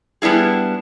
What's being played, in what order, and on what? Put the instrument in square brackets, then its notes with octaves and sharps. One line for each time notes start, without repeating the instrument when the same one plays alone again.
[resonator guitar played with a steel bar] G3 B3 D4 E4 G#4